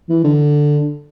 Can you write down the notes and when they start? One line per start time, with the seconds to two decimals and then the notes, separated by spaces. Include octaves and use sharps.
0.09 E3
0.24 D3